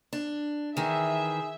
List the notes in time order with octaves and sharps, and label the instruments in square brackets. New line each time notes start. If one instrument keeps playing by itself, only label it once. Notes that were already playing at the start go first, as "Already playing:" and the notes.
[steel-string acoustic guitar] D4
[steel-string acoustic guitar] D#3 E3 [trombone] G#4 [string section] E5